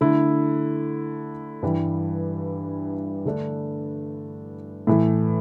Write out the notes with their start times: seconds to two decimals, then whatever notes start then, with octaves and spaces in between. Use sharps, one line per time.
0.01 D3 A3 E4
1.63 G2 E3 G3
3.25 D3 A3 D4
4.87 A2 E3 A3